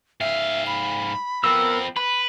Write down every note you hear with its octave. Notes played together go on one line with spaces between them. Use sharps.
G#2 E5 F5
B5
F3 B3 C4 A#4 E6
B4 B5